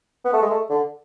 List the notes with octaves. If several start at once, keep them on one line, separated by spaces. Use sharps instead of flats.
B3
A3
G#3
A3
D3